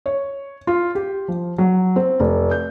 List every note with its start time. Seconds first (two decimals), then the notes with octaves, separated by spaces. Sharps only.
0.06 C#5
0.67 F4
0.95 G4
1.28 F3
1.58 F#3
1.96 C4
2.20 F1
2.51 G6